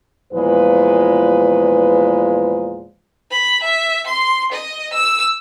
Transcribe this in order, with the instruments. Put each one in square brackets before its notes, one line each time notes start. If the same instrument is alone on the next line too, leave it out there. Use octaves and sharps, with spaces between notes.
[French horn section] E2 A#2 F3 G#3 B4
[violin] B5
E5
C6
D#5
E6